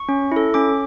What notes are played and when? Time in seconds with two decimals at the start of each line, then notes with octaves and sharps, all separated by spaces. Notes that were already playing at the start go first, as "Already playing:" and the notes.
Already playing: C#6
0.09 C#4
0.32 E4 A4
0.54 C#4 D6